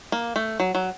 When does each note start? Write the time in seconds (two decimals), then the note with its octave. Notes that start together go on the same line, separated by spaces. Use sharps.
0.12 A#3
0.36 A3
0.60 F#3
0.75 F#3